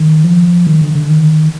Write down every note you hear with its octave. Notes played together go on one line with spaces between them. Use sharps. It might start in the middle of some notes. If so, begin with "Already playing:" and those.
Already playing: D#3
F3
D#3
D3
D3
D#3